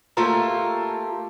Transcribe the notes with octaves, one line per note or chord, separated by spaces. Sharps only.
A3 A#3 F4 G4 A4 A#4